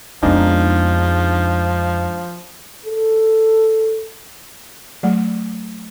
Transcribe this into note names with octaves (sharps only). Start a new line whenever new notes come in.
F2 F3 G#3 B3 D4 D#4
A4
F#3 A3 F#5